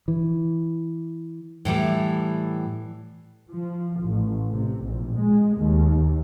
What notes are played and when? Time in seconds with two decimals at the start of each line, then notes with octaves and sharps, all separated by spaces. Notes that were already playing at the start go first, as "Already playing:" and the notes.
0.08 E3
1.65 A2 E3 G3 A4
3.49 F3
4.03 A1
4.53 C3
4.83 A#1
5.17 G#3
5.57 D#2